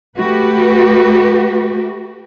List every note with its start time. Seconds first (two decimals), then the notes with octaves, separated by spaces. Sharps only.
0.18 A3 F#4 G4 B4